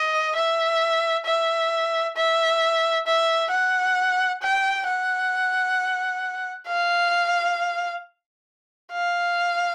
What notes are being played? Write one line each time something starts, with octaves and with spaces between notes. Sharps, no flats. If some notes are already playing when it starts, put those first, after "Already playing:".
Already playing: D#5
E5
E5
E5
E5
F#5
G5
F#5
F5
F5